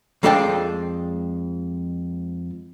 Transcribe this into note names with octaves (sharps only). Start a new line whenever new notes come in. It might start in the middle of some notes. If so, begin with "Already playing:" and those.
F2 G#3 A4 D5 G5 A5